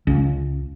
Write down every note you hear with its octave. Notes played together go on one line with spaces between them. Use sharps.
C#2